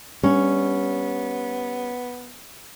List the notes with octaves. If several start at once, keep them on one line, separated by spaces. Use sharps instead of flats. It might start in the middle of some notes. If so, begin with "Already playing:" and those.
G3 B3 C#4 D4